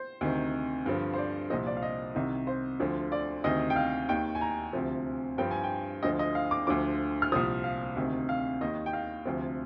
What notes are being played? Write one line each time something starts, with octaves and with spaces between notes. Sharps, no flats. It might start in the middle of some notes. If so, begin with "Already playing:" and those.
Already playing: C5
D2 C3 D#3
G2 D3 F3
C5
D5
C2 A#2 F3 D#5
D5
F5
D#5
C2 C3 D#3
C5
D2 D3 F3
D5
D2 C3 D#3 D#5
G5
F5
D#2 D#3 G5
G#5
A#5
D2 C3 F3
G2 F3 G5
G#5
G5
D2 D3 F3 D#5
D#5
F5
D6
D2 D3 F3 D6
F6
C2 A#2 F3 D#6
F5
D2 C3 D#3
F5
D#2 D#3 D#5
G5
F5
D2 C3 F3